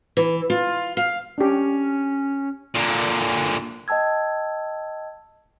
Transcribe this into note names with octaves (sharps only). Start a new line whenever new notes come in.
E3
F4
F5
C#4 D4 G4
A#2 D3
D#5 G5 A5 E6 G#6